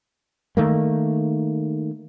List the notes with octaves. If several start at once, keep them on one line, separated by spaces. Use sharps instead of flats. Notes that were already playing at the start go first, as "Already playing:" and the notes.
D#3 A3 A#3